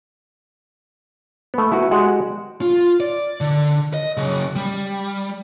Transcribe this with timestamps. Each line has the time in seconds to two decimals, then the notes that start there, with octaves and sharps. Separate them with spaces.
1.54 A3 B3
1.72 E4 F#4 B4
1.91 G#3 F#4 G4 D5 F#5
2.62 F4
3.00 D5
3.41 D3
3.94 D#5
4.17 C#3 F#3
4.56 G3